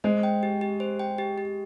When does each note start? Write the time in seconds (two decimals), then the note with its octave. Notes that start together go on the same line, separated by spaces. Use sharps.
0.04 G#3 C5
0.23 G5
0.43 G4
0.61 G4
0.80 C5
0.99 G5
1.18 G4
1.38 G4